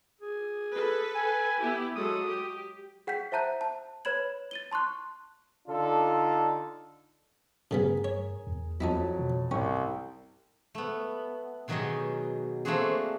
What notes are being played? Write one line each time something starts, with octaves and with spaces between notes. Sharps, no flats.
G#4
A4 B4
G#5
B3 E4 G4
F#3 G#3 A4 D#6
G4
G#4 F#5 G5 G6 B6
C5 E5 A5 A#5 F#6 G6
A5
B4 C#5 B5 G#6 F#7
A6 D#7 G7
A5 C6 C#6 F#6
D3 D4 D#4 F4 A4
G2 C#3 G3 B3 G#4 A#4
C#5
E2
F2 F#3 C#4 D#4 E4 A5
B2
C2 G#2 C#4 G5 C#6
A3 B3
B2 D#3 F#3 D#4 G4 G#4
A3 A#3 C4 D4 F#4 G#4